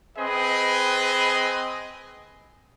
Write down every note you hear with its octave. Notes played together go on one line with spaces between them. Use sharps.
C4 G#4 B4 D#5